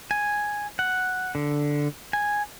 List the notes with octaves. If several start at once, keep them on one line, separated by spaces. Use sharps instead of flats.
G#5
F#5
D3
G#5